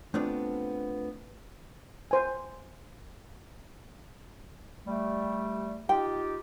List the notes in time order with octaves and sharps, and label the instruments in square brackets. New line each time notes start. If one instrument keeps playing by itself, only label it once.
[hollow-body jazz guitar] A3 B3 C4 D4 F4
[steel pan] C5 G#5
[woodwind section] G3 A3
[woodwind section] D#4 F4 G4 [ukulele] G5